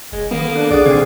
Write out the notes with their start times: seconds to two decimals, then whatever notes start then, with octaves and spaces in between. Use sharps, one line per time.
0.12 F1 G#3
0.31 D#3 A#3 B3
0.43 A4
0.56 D4
0.71 B1 G#4 D5 F#5 D#6
0.86 A#2 D3 C4 G#4 F5